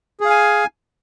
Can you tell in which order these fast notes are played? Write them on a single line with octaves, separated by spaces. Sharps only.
G#4 F5 G#5